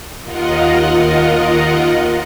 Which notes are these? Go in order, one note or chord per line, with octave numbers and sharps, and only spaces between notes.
D#2 F4 A#4 D#5 F#5